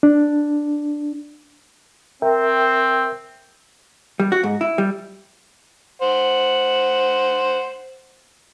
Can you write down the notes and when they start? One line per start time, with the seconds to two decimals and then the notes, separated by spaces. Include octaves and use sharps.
0.03 D4
2.22 C4 A#4 E5 G5
4.20 G3
4.32 F#4
4.43 G#2
4.61 E4
4.78 G3
6.02 C5 F#5